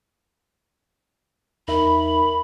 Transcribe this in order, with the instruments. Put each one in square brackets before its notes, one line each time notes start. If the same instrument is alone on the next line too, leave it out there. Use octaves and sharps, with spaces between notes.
[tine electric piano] E2 D#4 E5 [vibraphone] A#4 [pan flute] B5